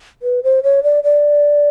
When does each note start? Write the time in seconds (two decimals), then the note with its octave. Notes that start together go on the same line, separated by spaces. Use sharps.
0.22 B4
0.43 C5
0.63 C#5
0.83 D5
1.04 D5